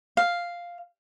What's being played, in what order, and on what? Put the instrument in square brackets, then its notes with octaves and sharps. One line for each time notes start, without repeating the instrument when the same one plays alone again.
[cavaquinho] F5